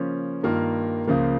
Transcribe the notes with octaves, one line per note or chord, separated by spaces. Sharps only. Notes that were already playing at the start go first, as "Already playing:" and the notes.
Already playing: C#3 F3 A#3 C#4
G2 D#3 A#3 F4 A#4
C#2 C#3 F3 A#3